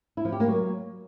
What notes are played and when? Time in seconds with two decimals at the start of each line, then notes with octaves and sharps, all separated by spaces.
0.17 E4
0.25 F3
0.32 G4
0.40 A#3
0.48 F#3